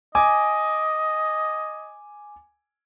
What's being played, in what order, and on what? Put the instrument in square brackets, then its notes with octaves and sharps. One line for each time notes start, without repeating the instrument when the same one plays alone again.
[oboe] D#5 [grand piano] G#5 D6